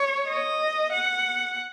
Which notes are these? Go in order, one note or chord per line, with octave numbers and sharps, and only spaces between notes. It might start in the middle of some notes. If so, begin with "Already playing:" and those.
Already playing: C#5
D#5
F#5